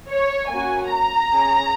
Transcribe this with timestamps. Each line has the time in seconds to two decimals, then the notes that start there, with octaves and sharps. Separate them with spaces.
0.10 C#5
0.50 A#3 C#4 F#4 G#5
0.91 A#5
1.32 C#4 G#4